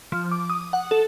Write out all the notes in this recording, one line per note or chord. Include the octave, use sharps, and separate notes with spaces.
F3
D6
D#6
F#5
A4